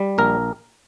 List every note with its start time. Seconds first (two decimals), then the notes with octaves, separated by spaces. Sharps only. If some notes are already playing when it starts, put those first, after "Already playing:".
Already playing: G3
0.18 A#1 A#4